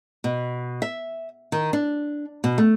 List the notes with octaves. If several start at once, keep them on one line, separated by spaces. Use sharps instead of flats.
B2
E5
D#3
D4
B2
A3